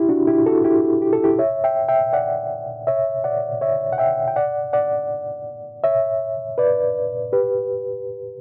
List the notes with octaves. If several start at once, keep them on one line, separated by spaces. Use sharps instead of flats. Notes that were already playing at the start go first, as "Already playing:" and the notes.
Already playing: E4 G4
D4 F#4
E4 G4
F#4 A4
E4 G4
G4
A4
E4 G4
C#5 E5
E5 G5
E5 G5
D5 F#5
C#5 E5
D5 F#5
C#5 E5
F#5
E5 G5
G5
D5 F#5
D5 F#5
C#5 E5
B4 D5
G4 B4